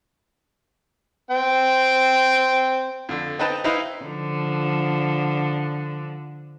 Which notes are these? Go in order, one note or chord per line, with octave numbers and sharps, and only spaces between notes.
C4 G5
F2 D3
C4 D#4 B4 D#5 G5 A5
D#4 E4 B4 C5 D#5 F5
D3 F3